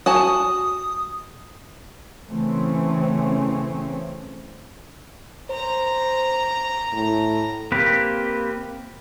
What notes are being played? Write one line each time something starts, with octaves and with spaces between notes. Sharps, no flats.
F#4 G#5 A5 D#6
C#3 E3 A3 C4 C#4
C5 A#5
A2
A#3 C4 G4 B4